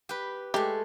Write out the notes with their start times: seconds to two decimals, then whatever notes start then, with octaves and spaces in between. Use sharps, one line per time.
0.09 G4 B4
0.54 G#3 A3 G4